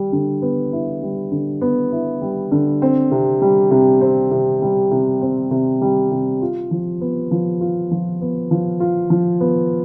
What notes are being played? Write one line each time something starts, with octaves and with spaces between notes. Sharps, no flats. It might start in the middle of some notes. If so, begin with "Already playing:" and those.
Already playing: G3
D3
B3
E4
G3
D3
B3
E4
G3
D3
C4
C3
G3
C3
C4
C3
G3
C3
C4
C3
G3
C3
F4
F3
B3
F3
F4
F3
B3
F3
F4
F3
B3